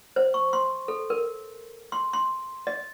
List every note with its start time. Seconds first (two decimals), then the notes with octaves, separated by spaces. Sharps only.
0.16 C5
0.34 C#6
0.53 C6
0.88 A4
1.10 A#4
1.92 C6
2.13 C6
2.67 D#5